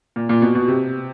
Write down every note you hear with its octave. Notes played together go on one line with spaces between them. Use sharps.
A#2
A#2
B2
B2
C3